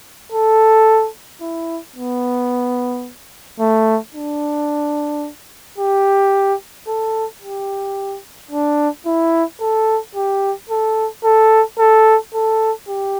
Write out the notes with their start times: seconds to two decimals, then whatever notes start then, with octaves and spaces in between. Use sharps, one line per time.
0.32 A4
1.41 E4
1.96 B3
3.60 A3
4.15 D4
5.78 G4
6.87 A4
7.42 G4
8.51 D4
9.06 E4
9.61 A4
10.15 G4
10.69 A4
11.24 A4
11.79 A4
12.33 A4
12.88 G4